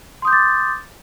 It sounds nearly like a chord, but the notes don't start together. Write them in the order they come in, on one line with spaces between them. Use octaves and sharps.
C6 D#6 G6 D6 A6